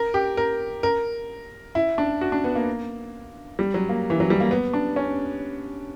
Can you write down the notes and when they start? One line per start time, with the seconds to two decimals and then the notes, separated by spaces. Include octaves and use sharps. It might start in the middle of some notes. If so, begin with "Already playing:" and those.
Already playing: A#4
0.14 G4
0.37 A#4
0.83 A#4
1.75 E4
1.98 D4
2.21 F#4
2.32 D4
2.44 B3
2.55 A#3
3.59 G3
3.74 F#3
3.89 A#3
4.10 E3
4.20 F#3
4.30 G3
4.40 A#3
4.51 B3
4.74 D4
4.96 C#4